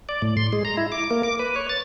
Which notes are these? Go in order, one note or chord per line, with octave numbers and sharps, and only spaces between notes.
D5
A2
C6
G#3
A#5
E4
D6
A#3
D6
B4
C#5
A6